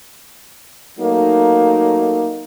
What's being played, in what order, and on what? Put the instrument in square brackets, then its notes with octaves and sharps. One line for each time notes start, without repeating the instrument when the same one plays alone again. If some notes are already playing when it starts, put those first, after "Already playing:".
[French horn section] F#3 A3 A#3 D#4